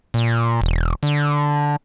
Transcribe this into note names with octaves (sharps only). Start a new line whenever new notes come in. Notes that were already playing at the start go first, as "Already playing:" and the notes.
A#2
E1
D3